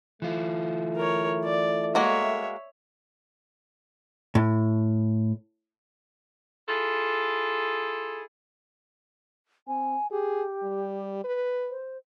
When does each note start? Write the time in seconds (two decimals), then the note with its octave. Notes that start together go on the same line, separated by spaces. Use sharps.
0.22 E3 A3 F4
0.96 A#4 C#5
1.44 D5
1.95 G#3 A#3 F#4 C#5 E5
4.35 A2
6.69 E4 F4 G#4 A4
9.68 C4 G#5
10.11 G4 G#4
10.63 G3
11.24 B4
11.70 C5